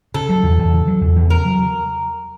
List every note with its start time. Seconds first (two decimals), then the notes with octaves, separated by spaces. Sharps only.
0.14 C#3 A4
0.29 F#3
0.43 E2
0.58 E2
0.73 C#3
0.87 F#3
1.01 E2
1.16 E2
1.30 C#3 A#4
1.45 F#3